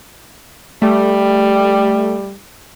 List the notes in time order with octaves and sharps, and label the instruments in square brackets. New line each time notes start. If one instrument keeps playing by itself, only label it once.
[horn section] G3 [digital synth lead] A3